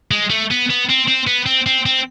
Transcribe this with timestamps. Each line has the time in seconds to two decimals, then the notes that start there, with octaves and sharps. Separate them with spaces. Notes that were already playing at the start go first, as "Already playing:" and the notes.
0.11 G#3
0.30 A3
0.51 B3
0.70 B3
0.89 C4
1.08 C4
1.27 B3
1.46 C4
1.66 C4
1.86 C4